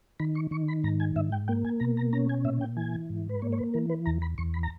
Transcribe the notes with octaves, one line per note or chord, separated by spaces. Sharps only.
D#3 B5
C#6
D#3 C#6
B5
G#2 A#5
G#5
G#2 E5
G5
A#3 G5
G#5
B2 A#5
A#5
C#4 A#5
G#5
A#2 E5
G5
E3 G#5
G#2
B4
A#3 C#5
C#5
B4
E3 A#4
B4
E2 A#5
B5
E2 C#6
B5
A#5